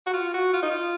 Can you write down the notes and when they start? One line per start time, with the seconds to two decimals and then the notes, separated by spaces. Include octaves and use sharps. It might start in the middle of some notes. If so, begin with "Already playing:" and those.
0.06 F#4
0.14 F4
0.34 F#4
0.53 F4
0.62 D#4
0.71 F4